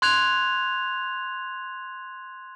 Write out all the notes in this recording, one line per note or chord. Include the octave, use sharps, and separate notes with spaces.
C6 F#6 G#6 F7